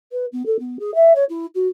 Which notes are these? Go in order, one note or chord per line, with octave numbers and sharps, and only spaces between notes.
B4
B3
A4
B3
G#4
E5
C#5
E4
F#4